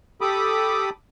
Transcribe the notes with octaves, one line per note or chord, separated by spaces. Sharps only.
G4 A4 B5 D6 D#6